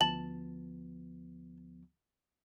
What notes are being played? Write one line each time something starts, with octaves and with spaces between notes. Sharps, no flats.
D2 F3 B3 A5 F#7